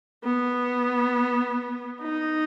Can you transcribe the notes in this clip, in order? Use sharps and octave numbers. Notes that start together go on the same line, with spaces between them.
B3
D#4